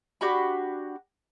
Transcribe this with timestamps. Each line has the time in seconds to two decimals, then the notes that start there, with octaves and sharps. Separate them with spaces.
0.21 D4 F#4 G4 B5